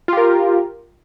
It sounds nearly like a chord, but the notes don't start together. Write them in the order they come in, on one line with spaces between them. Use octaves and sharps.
F4 G4 A#4